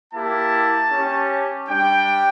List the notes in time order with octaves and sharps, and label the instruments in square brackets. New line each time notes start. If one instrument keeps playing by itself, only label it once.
[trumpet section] A#3 E4 G4 A5
C#4 G4
G3 D4 G4 G5